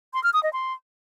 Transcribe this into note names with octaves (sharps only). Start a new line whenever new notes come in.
C6
F6
D#6
D#5
C6